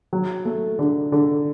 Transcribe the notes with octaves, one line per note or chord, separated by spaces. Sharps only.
F#3
A3
D3
D3